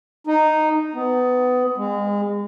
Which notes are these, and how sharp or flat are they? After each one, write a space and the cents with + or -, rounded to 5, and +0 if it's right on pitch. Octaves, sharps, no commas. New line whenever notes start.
D#4 -10
B3 +20
G#3 -30